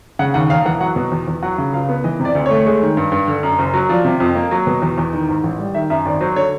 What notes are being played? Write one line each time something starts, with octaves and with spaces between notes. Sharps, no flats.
C#3 F#5
D#2 F#5
E1 F5
E3 F#5
F#3 F#5
B2
E2
E2
F#3 F#5
C#3
C#2 F5
B3
E3 D#5
C3
D5
D2
A3 C#5
G#3
D#3
G2
G2
D3
F#2
F#1
F#3
F3 D5
C3
F2
A#3
F#3
B2
E2
E2
D#3
G#2
A1
G3
D#3 E5
F#2 E5
G#1 D5
F#3 C5
D3 C#5